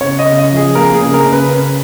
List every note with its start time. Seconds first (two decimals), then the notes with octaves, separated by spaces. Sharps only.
0.01 C#3 C#5
0.19 D#5
0.25 C#3
0.38 D#5
0.51 F3
0.56 G#4
0.75 A#3 A#4
0.94 G#4
1.01 C#3
1.14 A#4
1.25 C#3
1.32 B4
1.50 C#4